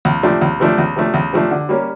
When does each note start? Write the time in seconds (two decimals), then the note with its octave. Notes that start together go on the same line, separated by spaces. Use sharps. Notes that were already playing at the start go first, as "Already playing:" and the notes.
0.05 C#2
0.23 C3 F3 A3 D4
0.41 C#2
0.60 C3 F3 A3 D4
0.78 C#2
0.96 C3 F3 A3 D4
1.14 C#2
1.33 C3 F3 A3 D4
1.51 D3
1.69 G3 A#3 C#4